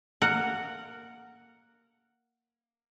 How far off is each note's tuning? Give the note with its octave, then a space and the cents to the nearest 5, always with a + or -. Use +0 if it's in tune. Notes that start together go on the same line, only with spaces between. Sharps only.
A#3 +0 A#4 -15 F#5 +0